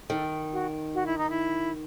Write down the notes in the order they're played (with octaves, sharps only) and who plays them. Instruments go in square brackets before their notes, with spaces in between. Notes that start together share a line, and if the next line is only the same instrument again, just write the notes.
[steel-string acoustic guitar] D#3 [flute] A4
[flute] F#4
F#4
E4
D#4
E4